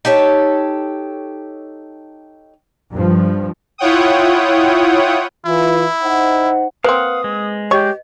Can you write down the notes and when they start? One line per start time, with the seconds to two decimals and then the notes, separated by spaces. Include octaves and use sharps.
0.05 D#4 G4 A4 C#5
2.92 G2 F3
3.78 E4 F4 C#5 F#5 G5 D#6
5.46 E3 E4 F4
6.02 D#4 C5 F#5
6.84 A#3 C4 B4 F5 F#5 D#6
7.24 G#3
7.71 G4 C#5 D#5